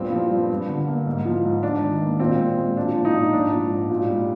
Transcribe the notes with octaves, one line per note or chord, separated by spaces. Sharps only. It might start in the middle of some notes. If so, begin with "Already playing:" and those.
Already playing: G2 A#2 C4
F3
G2
G2
D3
A#3
G#2
F3
G#2
G#2 D4
D#3
A#3
A#2 C4
G#3
G#3
A#2 D4
F3
D#4
A#2
G#2 D4
F3
G#2
A#2
G3